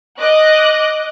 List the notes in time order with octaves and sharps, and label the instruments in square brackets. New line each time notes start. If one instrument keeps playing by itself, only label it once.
[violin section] D#5 D6 D#6 F#6